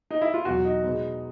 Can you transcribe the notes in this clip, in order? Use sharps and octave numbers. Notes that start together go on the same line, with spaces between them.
D#4
E4
F4
E2 B2 F#3 F#4
D#4
B2 G#3 B3